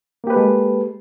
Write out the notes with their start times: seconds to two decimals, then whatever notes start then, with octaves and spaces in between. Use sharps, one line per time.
0.24 A#3
0.27 G4
0.30 B4
0.33 A4
0.36 G#3